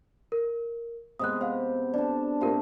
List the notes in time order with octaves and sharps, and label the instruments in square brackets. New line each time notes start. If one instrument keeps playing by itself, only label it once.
[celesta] A#4
[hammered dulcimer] C3 G#3 B3 [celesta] D#6 F#6
[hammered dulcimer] G4 [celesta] C5 F5 F#5
[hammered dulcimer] D4 A4 [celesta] D5
[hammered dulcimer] A#2 A3 C4 [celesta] F4 G4 A#4